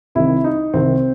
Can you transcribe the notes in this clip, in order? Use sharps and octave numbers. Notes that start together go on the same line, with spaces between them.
C2 C3 D#3 E4
D#4
C2 C3 D#3 C4